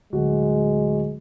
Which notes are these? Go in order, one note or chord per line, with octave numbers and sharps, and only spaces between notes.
D1 G#3 F#4